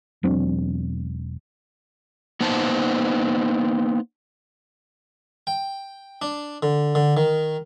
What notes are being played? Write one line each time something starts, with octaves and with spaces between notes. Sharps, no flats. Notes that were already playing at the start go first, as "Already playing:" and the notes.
E1 F#3 C4 D4
A#3 B3 D#4 C5 A5
G5
D4
D3
D3
D#3